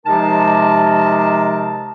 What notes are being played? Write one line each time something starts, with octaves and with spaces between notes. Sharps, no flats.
C3 F3 G#3 D#4 A#4 A5